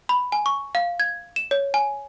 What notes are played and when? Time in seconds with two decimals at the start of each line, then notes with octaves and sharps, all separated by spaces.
0.09 B5
0.32 G#5
0.46 C#6
0.75 F5
1.00 G#6
1.36 E7
1.51 C#5
1.74 G#5